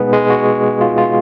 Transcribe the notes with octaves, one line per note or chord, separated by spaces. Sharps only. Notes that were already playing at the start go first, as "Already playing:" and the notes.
Already playing: B2 G#3 B3 D#4 G#4 B4
G#3 G#4
F#4
F4
F4